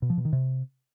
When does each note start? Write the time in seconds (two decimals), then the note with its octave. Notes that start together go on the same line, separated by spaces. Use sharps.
0.02 B2
0.10 F3
0.17 B2
0.25 D#3
0.33 C3